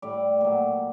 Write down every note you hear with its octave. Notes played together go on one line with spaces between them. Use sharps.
A2 G3 D5
A#2 F#3